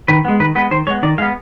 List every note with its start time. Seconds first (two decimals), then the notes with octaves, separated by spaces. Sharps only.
0.08 D#3 B4
0.25 G#3 B3
0.40 D#3 B4
0.55 G#3 B3 B4
0.71 D#3 C5
0.87 G#3 C#5
0.90 B3
1.03 D#3 D5
1.18 G#3 F5
1.22 B3